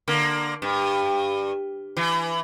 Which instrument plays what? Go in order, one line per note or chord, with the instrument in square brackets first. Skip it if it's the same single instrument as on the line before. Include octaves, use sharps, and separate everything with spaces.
[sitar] D3 A#3
G2
E3